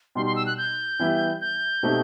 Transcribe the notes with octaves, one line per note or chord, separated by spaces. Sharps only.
B2 G3 D#4 C6
C6
E6
F#6
G6
E3 G3 B3 E4 G4
G6
B2 A3 C4 D#4 G4